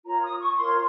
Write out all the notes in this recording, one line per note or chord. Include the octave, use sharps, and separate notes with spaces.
F4 A#4 C#5 A#5
D#6
C#6
F4 A#4 C#5 C6